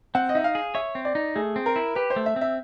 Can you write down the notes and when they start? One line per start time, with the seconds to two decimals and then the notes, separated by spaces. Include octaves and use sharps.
0.15 C4 F#5
0.29 D#5
0.35 D#4 E5
0.44 F5
0.55 G#4
0.75 C#5 E5
0.95 C4
1.05 D5
1.15 D#4
1.35 A3 G#4
1.56 C4
1.66 A#4
1.76 E4
1.95 G4 B4
2.10 C5
2.16 A3
2.26 E5
2.36 C4
2.41 E5